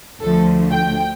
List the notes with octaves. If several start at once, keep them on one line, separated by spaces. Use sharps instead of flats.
D2 D3 F3 A3 A4
G5